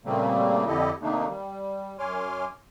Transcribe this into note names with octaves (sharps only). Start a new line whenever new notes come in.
A#2 C#3 G3 A3 A#3 C4
F2 D3 E4 G4 A4 D#5
C3 D#3 A3 A#3 D4 D#4
G3
F#2 C#5 G#5 C6 D6 F6